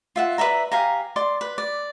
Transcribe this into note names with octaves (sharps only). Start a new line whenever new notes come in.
F4 E5 F#5
B4 D5 E5 A#5
G4 F5 G#5 A#5
D5 C6 D6
B4
D5